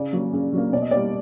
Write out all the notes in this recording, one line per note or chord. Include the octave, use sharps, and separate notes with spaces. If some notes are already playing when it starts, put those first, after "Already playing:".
Already playing: C#3 D5
F#3 A#3
C#3
F#3 A#3
B2 D5
D#5
G3 A#3 D5